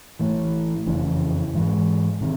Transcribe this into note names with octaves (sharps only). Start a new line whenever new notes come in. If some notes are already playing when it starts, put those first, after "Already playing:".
A1 A2 E3
F#1 F2 C#3 E3
G#2 E3 G#3
C3 D#3